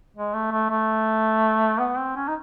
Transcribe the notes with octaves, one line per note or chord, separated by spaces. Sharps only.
G#3
A3
A3
A3
B3
C4
C#4
D#4